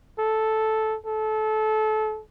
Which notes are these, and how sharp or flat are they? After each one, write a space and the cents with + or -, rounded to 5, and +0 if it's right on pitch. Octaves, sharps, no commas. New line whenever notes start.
A4 -5
A4 -25